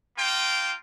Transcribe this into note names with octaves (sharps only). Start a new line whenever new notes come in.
A#3 F4 G5